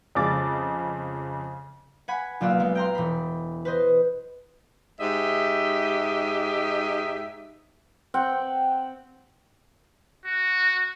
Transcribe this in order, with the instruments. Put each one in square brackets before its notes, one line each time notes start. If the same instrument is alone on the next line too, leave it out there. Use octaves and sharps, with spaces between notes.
[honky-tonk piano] F2 C#3 G#3 D6 A6
[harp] F#5 G#5 B5
B1 A#3 F4 D5 E6 F#6
G#3 B3
G5 A#5 C6
E1 B5
B4 C5 D#5
[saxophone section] G#2 G4 D#5 E5
[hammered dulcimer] C4 F#5 G5
[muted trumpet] F#4